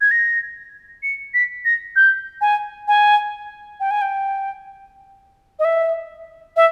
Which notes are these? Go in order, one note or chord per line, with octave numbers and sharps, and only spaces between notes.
G#6
A#6
C#7
B6
A#6
G6
G#5
G#5
G5
G#5
G5
D#5
E5
E5